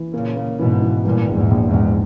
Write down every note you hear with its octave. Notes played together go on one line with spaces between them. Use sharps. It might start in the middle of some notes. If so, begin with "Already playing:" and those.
Already playing: E3
A#2 C#3 A#3
A#3
G#2 B2 E3
E3
G2 A#2 E3
A#1
E2 G#2
A#1
E2 G#2
A#1